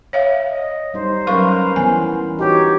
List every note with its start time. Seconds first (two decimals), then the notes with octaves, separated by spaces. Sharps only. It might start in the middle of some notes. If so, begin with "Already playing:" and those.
0.13 C#5 E5 F5
0.49 D#5
0.94 G3 D#4 C5
1.27 F#3 C#4 A#4 B4 F5 C#6
1.76 E3 B3 G#5
2.39 D#4 F#4 G4 C#5